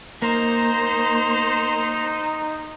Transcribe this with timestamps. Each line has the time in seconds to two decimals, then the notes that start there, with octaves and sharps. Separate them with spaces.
0.22 A#3 D#4 C5 A#5